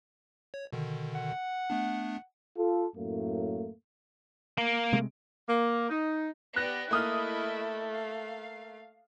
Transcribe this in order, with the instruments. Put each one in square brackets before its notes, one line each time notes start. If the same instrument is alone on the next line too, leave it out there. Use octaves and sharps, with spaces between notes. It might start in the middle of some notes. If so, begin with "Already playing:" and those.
[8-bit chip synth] C#5
B2 D3 D#3
[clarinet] F#5
[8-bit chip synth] A3 B3 D4
[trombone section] F4 A4
F#2 A2 A3 A#3
[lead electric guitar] A#3
[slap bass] C3 G#3 A3
[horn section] A#3
D#4
[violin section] B3 G4 D5 [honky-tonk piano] F#6 A#6
[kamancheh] A3 [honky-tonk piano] A#3 D#6 F6 [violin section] E4 D#5 B5
[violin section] F5